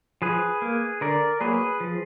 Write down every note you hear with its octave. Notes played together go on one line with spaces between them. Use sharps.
F3 G#4 B4
A#3
D3 A#4 D5
F#3 A#3 G#4 B4
F3